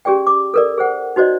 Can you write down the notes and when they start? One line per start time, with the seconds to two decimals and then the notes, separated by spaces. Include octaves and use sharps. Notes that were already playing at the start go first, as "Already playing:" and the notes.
0.05 C#4 G4 G#4 D5 G5
0.27 D6
0.54 A4 A#4 D5
0.78 G#4 C5 F#5
1.16 D#4 F#4 C5 D5 D#5